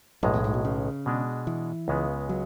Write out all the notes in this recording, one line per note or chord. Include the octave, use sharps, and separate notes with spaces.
B1 F#2 A2 G#3
E2
G#2
B2
C#3
B2 G#3 D4
E3
C#2 C#3 G#3 B3
F#3